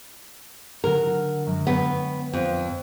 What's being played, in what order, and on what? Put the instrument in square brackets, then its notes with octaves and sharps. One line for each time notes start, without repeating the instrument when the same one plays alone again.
[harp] D3 F#3 F#4 [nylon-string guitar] A#4
[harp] F#2 F#3 G#3
[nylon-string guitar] B3 [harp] C#5 G5
[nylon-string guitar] F2